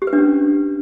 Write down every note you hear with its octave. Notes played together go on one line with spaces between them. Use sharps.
G4
B4
D4
C#4